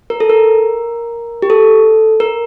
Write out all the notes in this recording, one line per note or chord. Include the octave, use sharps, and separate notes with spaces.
A#4
A4
A#4
G4
A4
A#4